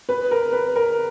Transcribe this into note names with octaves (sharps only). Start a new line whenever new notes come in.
B4
A#4
B4
A#4